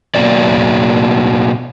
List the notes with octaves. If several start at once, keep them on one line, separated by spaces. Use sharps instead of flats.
B2 F#3 A#3 D5